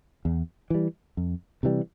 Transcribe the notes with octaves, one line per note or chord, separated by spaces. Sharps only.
E2
E3 G3
F2
C3 E3 G3